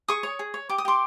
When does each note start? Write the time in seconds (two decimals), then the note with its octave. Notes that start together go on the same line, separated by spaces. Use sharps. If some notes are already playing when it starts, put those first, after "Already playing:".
0.08 G#4 C#6 D#6
0.23 C#5
0.39 G#4
0.54 C#5
0.69 G4 D6
0.78 D#6
0.85 G4 C6 D6